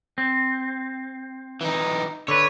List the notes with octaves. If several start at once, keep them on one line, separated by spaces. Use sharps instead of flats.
C4
E3 D#4
D3 B4 C#5